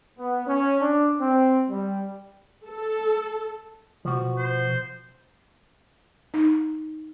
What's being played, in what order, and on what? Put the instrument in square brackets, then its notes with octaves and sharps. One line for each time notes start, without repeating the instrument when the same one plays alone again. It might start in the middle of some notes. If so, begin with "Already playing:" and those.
[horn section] B3
C#4
D4
C4
G3
[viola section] A4
[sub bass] B2 [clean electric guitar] F3 F#4
[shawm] C5
[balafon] D#4